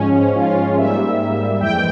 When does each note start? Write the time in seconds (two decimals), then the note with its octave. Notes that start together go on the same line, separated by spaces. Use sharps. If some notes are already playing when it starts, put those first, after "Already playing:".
Already playing: G#2 F3 G#3 C#4
0.15 C#4
0.35 F4
0.77 G#2 G3 A#3 E5
1.61 F2 E3 G#3 G5